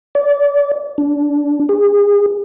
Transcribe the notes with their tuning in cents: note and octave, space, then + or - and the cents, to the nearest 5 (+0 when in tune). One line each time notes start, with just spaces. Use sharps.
D5 -30
D4 -20
G#4 -30